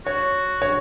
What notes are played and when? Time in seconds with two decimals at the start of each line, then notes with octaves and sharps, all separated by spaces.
0.06 F#4 C#5
0.62 C#5